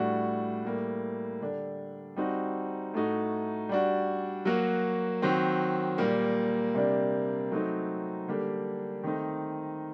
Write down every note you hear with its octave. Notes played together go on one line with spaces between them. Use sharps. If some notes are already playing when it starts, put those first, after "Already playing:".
Already playing: A2 G3 D4 F#4
A2 G3 A#3
D3 G3 D4
G3 C4 D#4 F#4
A2 A3 D#4 F#4
G3 D4 F#4
F#3 A#3 F#4
D#3 F#3 C4
A#2 G3 A#3
C3 G3 A#3 D4
F#3 A3 C4 D#4
D3 G3 A#3 D4 G4
D#3 A3 C4 D#4